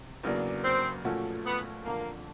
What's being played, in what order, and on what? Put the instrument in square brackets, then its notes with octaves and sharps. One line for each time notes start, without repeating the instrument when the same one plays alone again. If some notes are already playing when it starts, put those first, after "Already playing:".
Already playing: [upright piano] C3
E2 C#3 F#3 A#3 D4
[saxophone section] C4
[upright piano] A#2 F3 A3 C#4 F#4
[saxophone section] B3
[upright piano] F2 D3 F3 [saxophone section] A#3